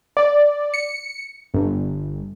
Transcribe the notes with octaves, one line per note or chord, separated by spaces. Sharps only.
D5
C#7
G1